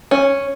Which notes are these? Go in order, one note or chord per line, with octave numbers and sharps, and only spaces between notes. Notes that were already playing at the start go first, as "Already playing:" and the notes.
C#4